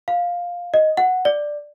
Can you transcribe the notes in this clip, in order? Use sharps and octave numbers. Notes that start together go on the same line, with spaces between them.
F5
D#5
F#5
D5